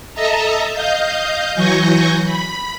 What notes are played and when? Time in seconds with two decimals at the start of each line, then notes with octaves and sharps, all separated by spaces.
0.14 A4 D#5 E5 A5 A#5
0.73 D#5 F5 G6
1.55 E3 F#3 G#5 C#6 G6 A#6
2.24 B5